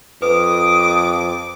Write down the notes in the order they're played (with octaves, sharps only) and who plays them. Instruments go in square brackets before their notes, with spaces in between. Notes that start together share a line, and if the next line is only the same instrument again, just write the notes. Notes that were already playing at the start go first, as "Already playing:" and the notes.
[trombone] F2 [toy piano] B4 [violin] D6 [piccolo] D#6